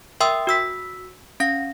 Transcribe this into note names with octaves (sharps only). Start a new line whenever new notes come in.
A#4 E5 G5 C6 D#6 E6
F#4 E6 B6
C#4 F5 A#6